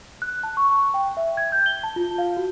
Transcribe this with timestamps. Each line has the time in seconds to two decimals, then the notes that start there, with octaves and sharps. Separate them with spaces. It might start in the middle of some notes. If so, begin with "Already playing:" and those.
0.22 F#6
0.43 A5
0.57 C#6
0.94 G5
1.17 E5
1.37 G#6
1.52 G6
1.66 G7
1.83 A5
1.96 F4
2.18 F5
2.37 F#4